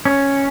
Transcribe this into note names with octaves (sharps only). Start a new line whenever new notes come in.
C#4